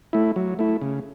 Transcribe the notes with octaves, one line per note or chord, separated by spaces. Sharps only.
A3 E4
F#3
A3 E4
C#3